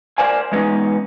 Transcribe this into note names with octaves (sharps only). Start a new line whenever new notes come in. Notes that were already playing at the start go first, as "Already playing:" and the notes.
A#4 C5 D5 F5 G#5
E3 G#3 B3 C#4 D#4